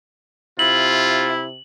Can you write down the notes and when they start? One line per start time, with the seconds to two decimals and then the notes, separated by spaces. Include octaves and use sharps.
0.59 C3 E4 F4 F#7